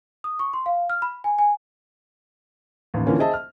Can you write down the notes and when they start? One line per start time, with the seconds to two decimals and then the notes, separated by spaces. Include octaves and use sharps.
0.24 D#6
0.39 C#6
0.53 C6
0.66 F5
0.90 F6
1.02 B5
1.24 G#5
1.39 G#5
2.94 A1 D#2
3.07 D3 E3 F3 A#3 C#4
3.19 G#4 C5 D#5 E5 A5
3.33 F6